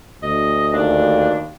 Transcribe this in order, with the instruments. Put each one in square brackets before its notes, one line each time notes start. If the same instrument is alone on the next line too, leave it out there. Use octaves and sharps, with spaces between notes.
[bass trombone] D2 [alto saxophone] D#5
[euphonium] D#2 [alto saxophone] D4